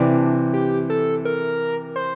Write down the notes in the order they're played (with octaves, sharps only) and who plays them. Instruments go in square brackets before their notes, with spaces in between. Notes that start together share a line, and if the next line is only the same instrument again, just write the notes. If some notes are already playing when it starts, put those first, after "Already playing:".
Already playing: [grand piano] C3 E3 [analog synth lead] D4
[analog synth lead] G4
A4
A#4
C5